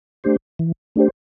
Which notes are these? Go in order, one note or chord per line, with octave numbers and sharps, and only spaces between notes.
A3 D4 G4 C5
E3
A3 D4 G4 C5